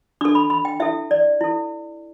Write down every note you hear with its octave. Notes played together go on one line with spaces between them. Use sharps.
D4 A4 D6
B5
B5
G5
E4 A4 E5
D5
E4 A4